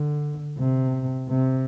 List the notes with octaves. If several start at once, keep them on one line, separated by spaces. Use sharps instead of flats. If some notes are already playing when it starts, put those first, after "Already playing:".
Already playing: D3
C3
C3